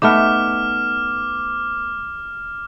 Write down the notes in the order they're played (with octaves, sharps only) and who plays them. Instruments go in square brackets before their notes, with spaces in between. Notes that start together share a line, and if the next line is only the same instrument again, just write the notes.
[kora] A3 B3 D#4 [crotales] D6 F6